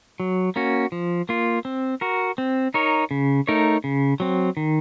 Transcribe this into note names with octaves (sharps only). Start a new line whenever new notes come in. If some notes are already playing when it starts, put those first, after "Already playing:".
F#3
A#3 C#4 F#4
F3
A#3 F4
C4
F#4 A#4
C4
D#4 A#4 C#5
C#3
A3 D#4 A#4 C#5
C#3
F#3 C4
D#3